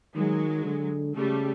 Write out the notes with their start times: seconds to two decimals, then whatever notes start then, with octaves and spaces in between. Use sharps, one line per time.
0.15 D#3 F#3 G#3
0.65 D3
1.15 C#3 G3 A3